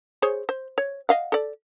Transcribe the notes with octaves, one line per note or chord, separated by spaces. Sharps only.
G#4 C5 C#5
C5
C#5
D#5 F5 F#5
A4 D5